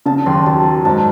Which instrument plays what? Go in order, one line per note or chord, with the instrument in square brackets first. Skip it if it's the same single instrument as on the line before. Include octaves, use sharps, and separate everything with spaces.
[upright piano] C#3 [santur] A5
[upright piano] D#2 [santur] C6
[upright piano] F#3 [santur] A5
[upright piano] F#3
[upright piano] G#2 [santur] A5